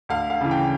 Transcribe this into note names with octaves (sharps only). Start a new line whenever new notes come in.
D2 F5
F5
C#3 E3
G5